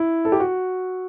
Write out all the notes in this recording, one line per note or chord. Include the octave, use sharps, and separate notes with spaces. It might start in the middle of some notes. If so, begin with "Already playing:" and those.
Already playing: E4
A4
G4
F#4